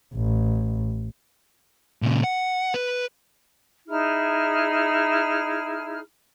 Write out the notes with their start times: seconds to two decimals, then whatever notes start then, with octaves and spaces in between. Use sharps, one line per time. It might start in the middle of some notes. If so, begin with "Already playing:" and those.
0.14 A1
2.02 A#2 C#3
2.24 F#5
2.74 B4
3.87 D#4 E4 G#4 F6